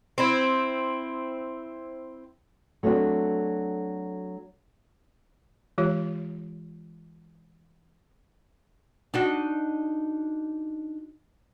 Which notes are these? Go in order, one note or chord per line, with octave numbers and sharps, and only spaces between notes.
C4 E4
F#3 A3 C4 D4 F#4
E3 G#3 F4 G4 C#5
D4 D#4 F#4